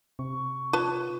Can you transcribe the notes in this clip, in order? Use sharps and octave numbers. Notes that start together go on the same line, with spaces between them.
C3 C#6
F4 B4 C#5 A5